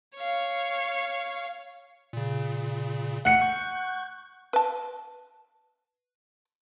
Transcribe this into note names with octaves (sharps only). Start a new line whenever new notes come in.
C#5 F5
A#2 C#3
A3 F#5 C#7
C#6 F#6 G6
B4 A5